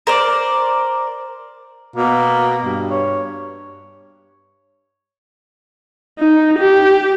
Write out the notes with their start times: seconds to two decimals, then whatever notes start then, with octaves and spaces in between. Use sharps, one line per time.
0.07 A#4 C5 D5
1.96 B2 A#3
2.63 G2
2.90 C#5
6.19 D#4
6.59 G4